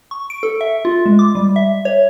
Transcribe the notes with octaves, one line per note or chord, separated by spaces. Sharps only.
C#6
D7
A4
E5
F4
G#3
D6
G3
E5
C#5